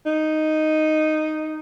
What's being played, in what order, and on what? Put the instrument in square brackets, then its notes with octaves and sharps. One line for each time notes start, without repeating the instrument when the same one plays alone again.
[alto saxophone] D#4